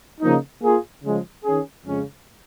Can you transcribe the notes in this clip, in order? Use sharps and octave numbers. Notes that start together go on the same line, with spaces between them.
C#3 F3 A#3 D#4
A#3 F4 G#4
C#3 F3 G#3
D#3 C#4 G#4
F2 C#3 G#3 C#4